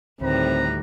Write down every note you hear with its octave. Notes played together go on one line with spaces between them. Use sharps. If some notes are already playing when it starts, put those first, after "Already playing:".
D2 A2 D#3 G3 C4 B4 A#5